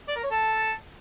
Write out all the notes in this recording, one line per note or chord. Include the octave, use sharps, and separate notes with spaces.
D5
A#4
C#5
A4